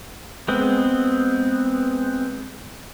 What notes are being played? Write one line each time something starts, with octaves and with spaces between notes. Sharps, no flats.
G#3 B3 C4